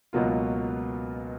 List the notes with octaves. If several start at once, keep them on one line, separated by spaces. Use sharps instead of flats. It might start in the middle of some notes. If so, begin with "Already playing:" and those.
C#2 B2 F#3 A#3 F4